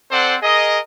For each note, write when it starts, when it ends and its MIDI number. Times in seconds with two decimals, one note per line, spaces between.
0.11 0.36 60
0.11 0.36 69
0.11 0.36 72
0.11 0.36 74
0.11 0.36 78
0.42 0.78 68
0.42 0.78 70
0.42 0.78 75